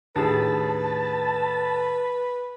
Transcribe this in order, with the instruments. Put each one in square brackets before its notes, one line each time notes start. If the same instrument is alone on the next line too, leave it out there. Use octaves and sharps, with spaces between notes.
[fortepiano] D#2 G#4 [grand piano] A2 D4 [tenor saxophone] B4 [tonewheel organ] A5